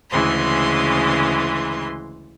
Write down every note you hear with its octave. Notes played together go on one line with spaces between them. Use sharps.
D2 C#3 E3 G#3 C6